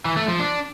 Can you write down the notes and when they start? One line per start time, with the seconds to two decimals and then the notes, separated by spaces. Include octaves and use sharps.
0.05 E3
0.17 A3
0.28 F3
0.40 D4